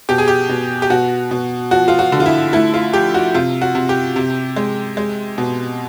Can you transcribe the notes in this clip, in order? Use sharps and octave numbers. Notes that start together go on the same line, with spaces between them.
B2 G4
G#4
G4
B2
G4
B2 F#4
B2
F3 F#4
F4
F#4
D3
F4
E4
A3 E4
F4
F3 G4
F#4
C3 F4
F#4
C3
G4
C3
G#3
G#3
B2